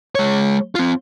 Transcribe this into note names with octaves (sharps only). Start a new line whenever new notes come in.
G#3 C#5
C4 F4